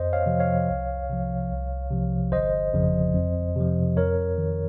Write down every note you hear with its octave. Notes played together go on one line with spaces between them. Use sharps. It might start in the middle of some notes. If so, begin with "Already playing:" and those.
Already playing: F2 C5 D#5
C#5 F5
C3 F3
C#5 F5
C2
C3 F3
C2
C3 F3
G1 C5 D#5
F2 C#3 F3
F2
C3 F3
F2 A#4 C#5
D#3